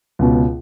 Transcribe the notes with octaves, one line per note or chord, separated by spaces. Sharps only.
C#2 B2